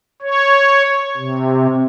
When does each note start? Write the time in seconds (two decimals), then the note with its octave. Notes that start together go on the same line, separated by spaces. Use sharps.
0.22 C#5
1.17 C3